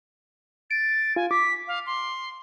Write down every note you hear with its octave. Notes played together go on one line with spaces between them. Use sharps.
A6 D7
F4 G#5
D6 B6
F5
C6